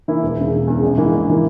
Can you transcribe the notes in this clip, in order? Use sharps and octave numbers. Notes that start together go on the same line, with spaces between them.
E3 A#3 E4
E1
E2 C#3
E1
E2 C#3
A#1
G#2 E3 A#3
A#1
E3 A#3